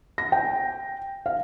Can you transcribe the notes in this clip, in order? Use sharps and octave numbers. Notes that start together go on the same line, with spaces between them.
A#6
G5
F5